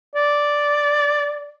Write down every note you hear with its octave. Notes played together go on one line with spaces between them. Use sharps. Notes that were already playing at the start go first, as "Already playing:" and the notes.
D5